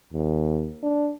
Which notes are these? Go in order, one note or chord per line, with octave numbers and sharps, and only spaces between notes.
D#2
D4